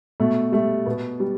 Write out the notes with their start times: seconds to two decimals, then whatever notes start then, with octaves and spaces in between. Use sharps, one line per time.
0.20 B2 A3
0.52 G3 A3
0.86 B2 B3
1.20 G3